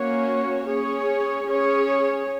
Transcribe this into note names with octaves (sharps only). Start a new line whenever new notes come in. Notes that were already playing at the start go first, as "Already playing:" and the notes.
Already playing: A#3 C#4 F#4 C#5
C#4 G#4 C#5
C#4 G#4 C#5